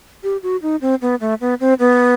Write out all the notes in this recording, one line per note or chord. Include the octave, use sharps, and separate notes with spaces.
G4
F#4
D#4
C4
B3
A3
B3
C4
B3